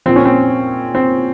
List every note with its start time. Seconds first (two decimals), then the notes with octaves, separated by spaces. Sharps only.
0.06 A#2 F3 C4
0.16 C#4
0.25 C4
0.95 C4